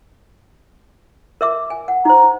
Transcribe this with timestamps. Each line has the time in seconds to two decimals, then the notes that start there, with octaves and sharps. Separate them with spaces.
1.41 A#4 E5 D6
1.70 G#5
1.88 F#5
2.05 D#4 C5 A#5